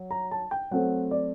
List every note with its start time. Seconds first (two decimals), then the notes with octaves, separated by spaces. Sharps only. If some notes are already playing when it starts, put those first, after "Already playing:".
Already playing: F#3
0.11 A#5
0.31 A5
0.51 G5
0.71 F#3 A3 C4 F#5
1.11 D5